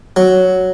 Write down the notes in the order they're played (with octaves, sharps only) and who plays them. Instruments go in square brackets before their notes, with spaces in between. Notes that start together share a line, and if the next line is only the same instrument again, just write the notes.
[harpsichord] F#3